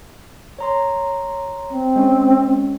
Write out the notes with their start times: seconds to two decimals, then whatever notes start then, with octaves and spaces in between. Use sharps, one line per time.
0.59 C#5 A#5 C6
1.70 C4
1.96 G#3 C#4